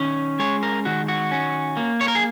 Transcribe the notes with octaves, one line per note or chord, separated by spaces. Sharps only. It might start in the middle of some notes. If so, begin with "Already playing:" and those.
Already playing: D#3 C#4
G#3 C#5
A#4
D#3 F#4
F#4
C#4
A#3
C#5
A#4
G#4